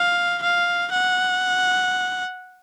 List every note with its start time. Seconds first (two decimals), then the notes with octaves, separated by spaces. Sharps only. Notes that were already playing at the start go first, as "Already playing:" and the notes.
Already playing: F5
0.43 F5
0.92 F#5